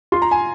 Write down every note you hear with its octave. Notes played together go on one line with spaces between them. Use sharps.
F4 C6
A#5
G#5